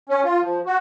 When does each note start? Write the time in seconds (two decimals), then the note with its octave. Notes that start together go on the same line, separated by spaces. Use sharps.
0.09 C#4
0.24 F4
0.41 F3
0.66 F#4